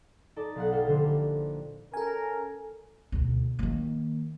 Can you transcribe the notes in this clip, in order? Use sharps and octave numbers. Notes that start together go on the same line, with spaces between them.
D#4 A4 D5 A5
B1 F5 F#5
G4 A4 C#5 F5 G5
A#1 D3 C5
C#4 A4 A#4 G#5
D2 B2
D#3 A#3